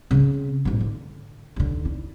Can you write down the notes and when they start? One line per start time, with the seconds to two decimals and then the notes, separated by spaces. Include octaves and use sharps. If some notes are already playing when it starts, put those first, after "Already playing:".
0.11 C#3 C4
0.65 A1 G#2
0.81 D3
1.56 D#2 D3
1.85 E4